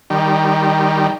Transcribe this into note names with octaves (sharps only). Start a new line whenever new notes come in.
D#3 G3